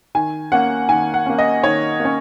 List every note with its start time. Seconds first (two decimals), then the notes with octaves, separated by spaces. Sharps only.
0.15 D#3 G#5
0.52 A#3 C#4 F#5
0.89 D#3 G#5
1.14 F#5
1.26 A#3 C#4
1.39 D#5
1.63 D#3 C#5
2.00 A#3 C#4